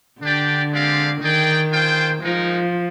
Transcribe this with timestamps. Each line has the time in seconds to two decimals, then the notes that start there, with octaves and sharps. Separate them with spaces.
0.21 D3 D4 G4 D5 G5
0.71 G#3 C4 G4 D5 F5
1.21 D#3 D#4 G#4 D5 G5
1.71 F4 G#4 C5 G5
2.21 F3 G#3 D#4 A#4